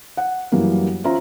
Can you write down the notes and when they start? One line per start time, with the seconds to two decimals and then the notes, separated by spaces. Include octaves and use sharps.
0.17 F#5
0.52 F#2 E3 F#3 G3 A#3
1.04 C#4 F4 C5 E5 A#5